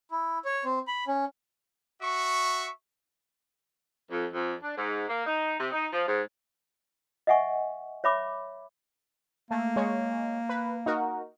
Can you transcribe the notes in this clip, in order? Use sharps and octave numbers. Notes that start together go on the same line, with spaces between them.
E4
C#5
C4
B5
C#4
F#4 E5 C#6
F2
F2
D4
G#2
A#3
D#4
C3
D#4
F3
G#2
D#5 E5 F#5 G#5 C#6
C#5 E5 B5 D6
A3 A#3
G#3 C#5
B4
D#4 F#4 A#4